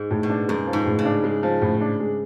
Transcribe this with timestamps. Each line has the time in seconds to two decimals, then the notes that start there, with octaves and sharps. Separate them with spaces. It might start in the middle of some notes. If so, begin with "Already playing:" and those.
Already playing: G#2
0.11 A2
0.23 B2
0.30 D4
0.48 F#2 G#3
0.67 F3
0.73 G#2
0.86 A2
0.99 C#3
1.05 D4
1.24 G#3
1.43 F3
1.62 A2
1.81 D4
2.00 G#3